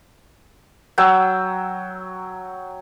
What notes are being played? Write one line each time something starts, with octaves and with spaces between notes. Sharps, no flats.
F#3 G5 E6